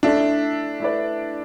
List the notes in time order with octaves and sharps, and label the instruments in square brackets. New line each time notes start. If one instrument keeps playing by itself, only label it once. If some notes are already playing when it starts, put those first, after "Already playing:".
[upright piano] A3 E4 A4 E5 [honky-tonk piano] D4
[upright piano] A3 E4 B4 D5